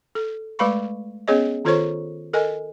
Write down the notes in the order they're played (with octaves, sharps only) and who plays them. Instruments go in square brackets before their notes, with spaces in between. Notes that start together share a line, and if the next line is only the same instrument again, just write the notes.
[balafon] A4
G#3 A3 B4 F5 B5 C#6
B3 C#4 G#4 C#5 D#5
D#3 F4 A4 C5 C#5 C#6
A4 A#4 D#5 G#5